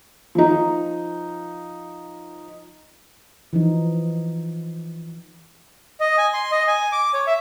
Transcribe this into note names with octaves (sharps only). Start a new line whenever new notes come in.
F3 D#4
E3 F3 D#4
D#5
G#5
C6
D#5
G#5
D6
C#5
E5